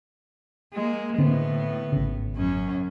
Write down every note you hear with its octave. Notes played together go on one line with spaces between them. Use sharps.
G#3 A#3
A2 D3 B3 C4
G#1 C#3
F#2 C#4